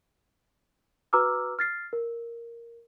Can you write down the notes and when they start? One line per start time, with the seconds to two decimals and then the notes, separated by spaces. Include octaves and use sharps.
1.13 F#4 B4 A#5 D6 E6 F6
1.59 F6 A6 C7
1.93 A#4